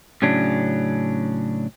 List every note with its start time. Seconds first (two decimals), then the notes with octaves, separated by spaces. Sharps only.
0.22 A2 C#3 F#3 C#4 D4